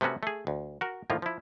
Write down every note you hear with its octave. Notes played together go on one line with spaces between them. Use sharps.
C3 A3 B3 C#4 F#4
A3 G#4
D2
F#4 A#4
A2 D#3 F3 A#3 F4
F3 E4